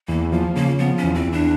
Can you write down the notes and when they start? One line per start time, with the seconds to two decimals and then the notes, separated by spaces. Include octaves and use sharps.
0.08 E2 A#3
0.32 F3 A#3
0.55 C#3 A#3
0.79 F3 B3
0.98 C#4
1.03 E2
1.15 C4
1.27 E2
1.32 D4